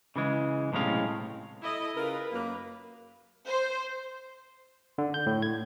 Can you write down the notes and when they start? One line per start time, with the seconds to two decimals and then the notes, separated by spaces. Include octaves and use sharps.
0.16 C#3 E3 G#3
0.72 B1 A2 C3 G#3 C#4 F5
1.62 E4 A4 D#5
1.96 C#3 F4 A#4 B4
2.32 F#2 A#3
3.46 C5
4.98 D3
5.14 G6
5.26 A2
5.42 G#6